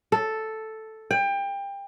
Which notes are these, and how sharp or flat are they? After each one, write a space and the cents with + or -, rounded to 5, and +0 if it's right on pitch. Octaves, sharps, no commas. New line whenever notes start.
A4 +0
G5 +25